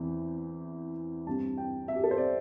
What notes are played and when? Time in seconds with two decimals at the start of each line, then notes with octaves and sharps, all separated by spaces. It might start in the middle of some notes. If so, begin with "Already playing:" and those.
Already playing: E2 E3 C4
1.27 G2 G3 C4 A5
1.58 G5
1.88 E5
1.96 G4
2.04 A4
2.11 C5
2.18 D5